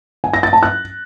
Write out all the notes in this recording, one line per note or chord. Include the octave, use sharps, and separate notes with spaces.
G#5
A#6
A6
A5
F#6